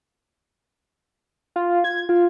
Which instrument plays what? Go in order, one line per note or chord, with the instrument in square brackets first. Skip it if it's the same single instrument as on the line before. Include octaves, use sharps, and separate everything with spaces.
[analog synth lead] F4
G#6
F4